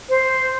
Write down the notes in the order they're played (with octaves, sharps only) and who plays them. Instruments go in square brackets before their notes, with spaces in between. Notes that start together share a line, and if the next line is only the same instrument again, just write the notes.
[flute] C5